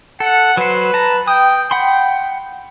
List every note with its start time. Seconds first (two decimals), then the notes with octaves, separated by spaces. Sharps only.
0.20 A4 F#5
0.57 F#3 B4 C5
0.94 A5 A#5
1.27 G5 D#6
1.71 F#5 G5 B5 C6